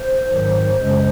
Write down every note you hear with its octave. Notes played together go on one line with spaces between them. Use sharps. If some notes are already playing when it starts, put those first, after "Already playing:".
Already playing: C5
G#2 D#3 F#3
F#2 C#3 G#3